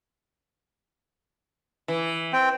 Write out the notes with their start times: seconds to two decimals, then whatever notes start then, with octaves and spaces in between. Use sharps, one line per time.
1.88 E3
2.33 C4 G5